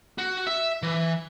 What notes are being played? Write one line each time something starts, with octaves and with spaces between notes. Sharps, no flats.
F#4
E5
E3